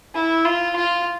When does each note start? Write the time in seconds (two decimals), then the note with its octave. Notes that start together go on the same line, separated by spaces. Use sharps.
0.15 E4
0.45 F4
0.76 F4